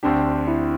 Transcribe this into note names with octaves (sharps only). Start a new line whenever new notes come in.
D2 D3 C4 D4 G4
E4